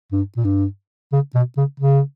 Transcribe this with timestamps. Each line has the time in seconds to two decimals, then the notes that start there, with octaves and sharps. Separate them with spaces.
0.12 G2
0.37 A#2
0.45 G2
1.12 C#3
1.35 B2
1.57 C#3
1.80 C#3